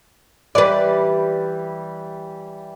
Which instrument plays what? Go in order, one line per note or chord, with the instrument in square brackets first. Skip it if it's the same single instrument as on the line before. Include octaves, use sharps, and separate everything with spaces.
[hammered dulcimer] E3 G3 [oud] B4 D5